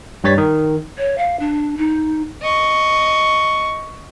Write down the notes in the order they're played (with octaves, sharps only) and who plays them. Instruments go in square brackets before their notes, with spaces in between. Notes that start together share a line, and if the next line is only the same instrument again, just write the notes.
[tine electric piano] G2 G3 C#5 A6 B6
D#3
[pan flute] C#5
F5
D4
D#4
[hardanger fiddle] D#5 C#6